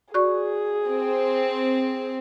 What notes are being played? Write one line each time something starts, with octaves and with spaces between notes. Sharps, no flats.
F#4 G#4 D5 C#6
C4